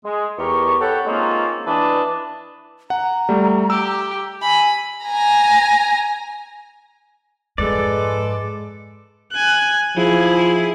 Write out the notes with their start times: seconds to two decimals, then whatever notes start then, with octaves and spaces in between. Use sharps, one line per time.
0.05 G#3
0.38 E2 G4 A#4 C#6
0.81 A4 C#5 F#5 G5 A5 B5
1.07 G#3 A#3 C4 C#4 D#4 F4
1.67 E3 D4 B4 D#5 A5
2.90 F#5 A#5
3.29 G3 A3
3.70 G4 E6
4.42 G#5 B5
5.06 G#5 A#5
7.58 F2 G#2 G#3 A4 B4 D5
9.32 G#5 F#6
9.97 F3 E4 G#4